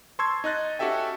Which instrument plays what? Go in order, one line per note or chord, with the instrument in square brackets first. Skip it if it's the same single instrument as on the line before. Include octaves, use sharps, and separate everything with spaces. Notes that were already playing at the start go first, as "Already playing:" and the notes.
[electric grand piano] A5 C6 C#6 E6 G#6
D#4 D#5 F#6 A6
C#4 F#4 G4 A4 E5 G5